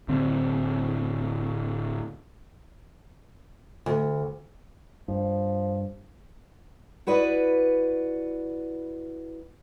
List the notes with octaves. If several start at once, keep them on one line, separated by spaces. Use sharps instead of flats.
D1 D3 C4
D2
G2 F3
E4 F#4 B4 D5 D#5